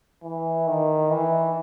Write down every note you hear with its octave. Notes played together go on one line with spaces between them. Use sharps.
E3
D#3
E3